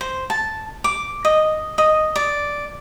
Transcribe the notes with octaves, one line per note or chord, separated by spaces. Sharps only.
C5
A5
D6
D#5
D#5
D5